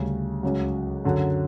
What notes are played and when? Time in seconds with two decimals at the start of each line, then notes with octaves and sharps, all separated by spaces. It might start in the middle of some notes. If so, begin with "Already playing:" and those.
Already playing: D2 C#3 G3 C#4
0.43 C#2 C#3 F#3
1.05 F#2 D3 F#3